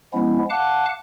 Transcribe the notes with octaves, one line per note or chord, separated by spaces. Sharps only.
F3 G#3 B3 C#4 E4
F5 F#5 A5 D6 F#6